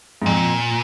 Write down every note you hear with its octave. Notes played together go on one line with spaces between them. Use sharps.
G#2
F2 A#2